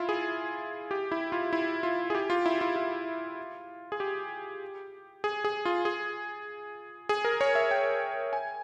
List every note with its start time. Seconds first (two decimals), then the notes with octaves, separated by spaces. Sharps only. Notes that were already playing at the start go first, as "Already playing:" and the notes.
Already playing: E4 F4
0.09 G#4
0.91 G4
1.12 E4
1.32 F4
1.53 E4
1.83 F4
2.10 G#4
2.15 G4
2.30 F4
2.46 E4
2.61 F4
2.76 F4
3.92 G#4
4.00 G4
5.24 G#4
5.44 G#4
5.65 F4
5.85 G#4
7.09 G#4
7.25 A#4
7.41 C#5
7.55 E5
7.71 G5
8.33 G#5